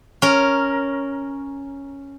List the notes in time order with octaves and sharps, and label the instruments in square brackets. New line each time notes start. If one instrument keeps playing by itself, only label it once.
[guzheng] C#4 A#4